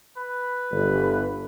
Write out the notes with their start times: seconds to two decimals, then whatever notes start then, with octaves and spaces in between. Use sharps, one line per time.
0.18 B4
0.72 G1